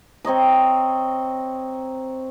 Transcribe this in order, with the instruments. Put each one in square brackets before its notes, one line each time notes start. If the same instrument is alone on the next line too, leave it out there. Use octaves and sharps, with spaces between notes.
[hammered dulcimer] C4 C#5 D#5 A#5